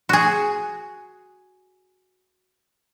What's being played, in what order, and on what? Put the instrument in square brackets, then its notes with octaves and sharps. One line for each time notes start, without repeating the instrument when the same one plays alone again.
[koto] F#4 G#4